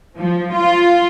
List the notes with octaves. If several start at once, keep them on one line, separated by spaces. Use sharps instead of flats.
F3
F4